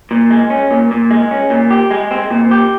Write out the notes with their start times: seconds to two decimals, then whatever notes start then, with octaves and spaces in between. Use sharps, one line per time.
0.11 A#2
0.31 G#3
0.50 C#4
0.71 A#2
0.91 A#2
1.11 G#3
1.31 C#4
1.50 A#2
1.71 G4
1.91 G#3
2.11 C4
2.30 A#2
2.51 G4